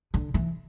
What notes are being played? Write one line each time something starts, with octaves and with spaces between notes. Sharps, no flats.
D3
E3